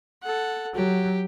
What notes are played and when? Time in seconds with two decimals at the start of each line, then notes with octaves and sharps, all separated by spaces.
0.23 A4 F#5
0.75 F#3 G4